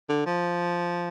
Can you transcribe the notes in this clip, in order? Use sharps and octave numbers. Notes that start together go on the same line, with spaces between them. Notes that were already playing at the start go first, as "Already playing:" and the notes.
D3
F3